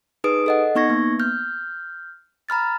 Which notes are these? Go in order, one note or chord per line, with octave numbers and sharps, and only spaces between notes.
D#4 G#4 B4 D#6 D7
A4 D#5 F#5
B3 D#4 C#6 G#6 A#6
A#3 B3
F6 G6
A#5 B5 F6 A6